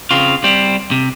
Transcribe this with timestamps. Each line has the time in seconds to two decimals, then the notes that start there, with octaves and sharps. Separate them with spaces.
0.11 C#3 C4 F4
0.44 G3 C4
0.91 C3